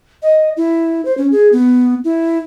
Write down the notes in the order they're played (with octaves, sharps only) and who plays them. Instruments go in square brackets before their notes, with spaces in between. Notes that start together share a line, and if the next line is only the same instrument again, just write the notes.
[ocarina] D#5
E4
C5
C#4
G#4
B3
E4